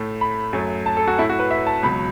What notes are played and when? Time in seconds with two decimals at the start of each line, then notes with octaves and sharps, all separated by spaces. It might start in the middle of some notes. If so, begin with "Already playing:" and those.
Already playing: A2 A3
0.21 B5
0.53 F#2 F#3 A3
0.86 A5
0.97 A4
1.08 F#4
1.18 A2 A3 E4
1.29 F#4
1.39 B4
1.51 E5
1.67 A5
1.83 C#2 B2 F#3 B5